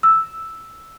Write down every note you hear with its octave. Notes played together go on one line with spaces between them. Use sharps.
E6